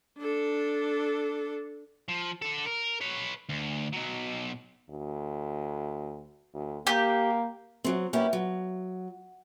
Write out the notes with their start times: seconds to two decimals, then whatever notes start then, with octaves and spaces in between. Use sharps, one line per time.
0.18 D4 A4
2.09 F3
2.42 D3 A4
2.66 A#4
3.01 B4 C#5
3.49 D2
3.93 B2 F#3
4.90 D2
6.54 D2
6.87 A#3 G4
7.84 F#3 C4
8.13 A#3 B3 C#4 E4 G4
8.33 F#3